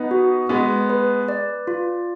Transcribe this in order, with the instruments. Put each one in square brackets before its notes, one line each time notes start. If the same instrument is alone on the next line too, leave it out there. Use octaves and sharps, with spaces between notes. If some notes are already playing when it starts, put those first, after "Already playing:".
Already playing: [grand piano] B3 D#4
[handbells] F#4
[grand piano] G#3 B3 [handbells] B4
[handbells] B4
D5
F4